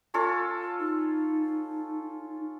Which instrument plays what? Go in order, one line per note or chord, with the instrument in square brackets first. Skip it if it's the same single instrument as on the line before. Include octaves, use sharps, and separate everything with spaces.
[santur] C#4 F4 A4
[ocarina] D#4